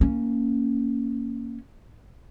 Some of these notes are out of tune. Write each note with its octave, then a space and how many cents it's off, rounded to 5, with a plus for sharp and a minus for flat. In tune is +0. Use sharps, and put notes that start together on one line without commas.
A#3 -10 C#4 +0